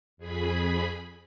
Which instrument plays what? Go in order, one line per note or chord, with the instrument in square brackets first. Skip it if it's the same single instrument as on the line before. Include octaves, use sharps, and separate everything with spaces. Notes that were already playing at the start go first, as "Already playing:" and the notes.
[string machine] F2 G#4 B5